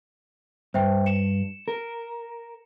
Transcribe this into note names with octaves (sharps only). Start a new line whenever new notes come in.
G2 C5 E5 G5
C#7 E7
A#4